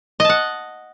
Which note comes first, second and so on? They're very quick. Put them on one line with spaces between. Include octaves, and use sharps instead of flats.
D#5 A5 F#5